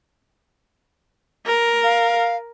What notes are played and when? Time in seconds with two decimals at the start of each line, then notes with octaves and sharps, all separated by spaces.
1.46 A#4
1.84 F5